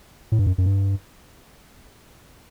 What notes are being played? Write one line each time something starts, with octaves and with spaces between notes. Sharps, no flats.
A2
G2
F#2
F#2
G2